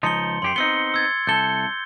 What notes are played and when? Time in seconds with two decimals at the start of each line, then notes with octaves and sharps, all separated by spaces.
0.03 C#2 F3 D#4 C6 C#7 G7
0.42 F#2 G4 C6 C7
0.56 B3 C4 D#4 C#7 G7
0.94 E6 G#6 A6
1.27 C2 A4 G6 G7